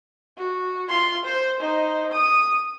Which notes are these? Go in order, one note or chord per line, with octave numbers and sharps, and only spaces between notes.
F#4
F4 C6
C5
D#4 C5
D#6